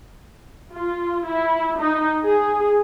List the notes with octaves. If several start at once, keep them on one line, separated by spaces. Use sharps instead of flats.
F4
E4
D#4
G#4